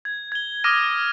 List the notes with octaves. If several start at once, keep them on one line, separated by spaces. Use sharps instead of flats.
G#6
G#6 G7
D6 D#6 F6 A#6 D#7